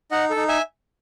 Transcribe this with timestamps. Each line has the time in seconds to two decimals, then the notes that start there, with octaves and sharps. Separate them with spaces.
0.11 D#4 D#5 F#5
0.30 A4
0.36 D#4
0.48 E5 G#5